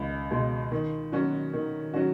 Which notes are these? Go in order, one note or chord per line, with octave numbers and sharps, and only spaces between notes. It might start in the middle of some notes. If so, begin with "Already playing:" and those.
Already playing: C#2
B2 G#3
D#3
F#3 C#4 F#4
D#3
F#3 C#4 F#4